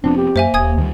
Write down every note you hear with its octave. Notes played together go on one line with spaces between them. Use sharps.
F1 F3 B3 C4 D4
G4
F#2 A#3 C5 E5 G#5
D1 D#2 G#5 D#6 G#6
D2 D#3 G3